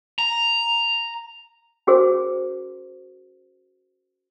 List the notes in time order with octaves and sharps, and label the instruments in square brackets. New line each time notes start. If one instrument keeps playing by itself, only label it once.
[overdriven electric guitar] A#5
[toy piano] C#4 F#4 G#4 A#4 C5